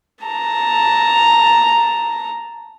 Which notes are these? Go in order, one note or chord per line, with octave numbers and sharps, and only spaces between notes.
A5 A#5